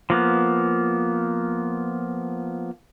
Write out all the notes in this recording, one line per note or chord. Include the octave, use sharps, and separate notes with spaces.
F3 A#3 B3